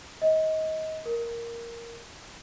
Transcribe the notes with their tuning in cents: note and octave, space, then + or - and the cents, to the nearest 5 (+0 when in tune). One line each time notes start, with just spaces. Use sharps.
D#5 +25
A#4 +0